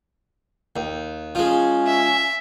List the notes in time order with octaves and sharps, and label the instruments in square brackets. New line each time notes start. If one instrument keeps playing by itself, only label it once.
[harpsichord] D#2
[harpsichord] F3 G#3 [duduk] C#4
[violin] E5